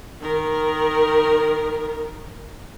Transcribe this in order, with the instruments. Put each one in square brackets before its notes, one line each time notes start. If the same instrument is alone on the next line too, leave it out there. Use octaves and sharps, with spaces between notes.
[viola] D#3 A#4